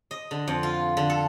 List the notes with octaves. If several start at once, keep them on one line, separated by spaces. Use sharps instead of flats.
D#5
D3
F2
F4
D3
A4